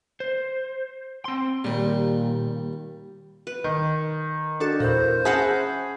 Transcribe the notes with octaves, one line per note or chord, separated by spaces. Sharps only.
C5
C4 C6
D#2 A#2 G3
B4
D#3
D4 F#4 A4
E2 A#2 C5
C#4 G#4 E5 F#5 A5 B5 A#6